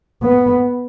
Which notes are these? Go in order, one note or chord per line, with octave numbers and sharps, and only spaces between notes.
B3